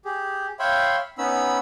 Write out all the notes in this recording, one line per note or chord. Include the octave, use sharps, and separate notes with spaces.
G4 G#4
C#5 E5 F5 G5 B5 C6
B3 C#4 D#4 B5 E6